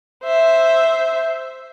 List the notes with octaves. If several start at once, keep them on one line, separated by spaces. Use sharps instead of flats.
C5 E5